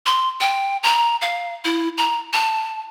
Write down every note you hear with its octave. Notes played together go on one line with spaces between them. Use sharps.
C6
G5
A#5
F5
E4
A#5
A5